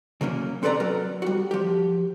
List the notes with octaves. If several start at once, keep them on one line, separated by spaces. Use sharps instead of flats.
C#3 F#3 A#3 C#4
C4 A4 B4 D5 G5 A#5
F#3 A#4
G3 F#4
F3 G4